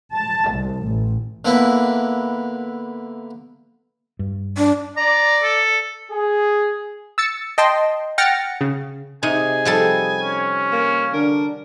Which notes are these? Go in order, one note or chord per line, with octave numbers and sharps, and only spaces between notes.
A5
C2
A1
D3 A#3 B3 E4
G2
D4
D5 A#5
A4
G#4
E6 A6 C#7
D#5 G5 A5 C6
F#5 G5 F6 A6 A#6 C#7
C#3
C3 D#4 G#4 G#5
F3 G3 A4
C#4
A#3
D3 D4 A#4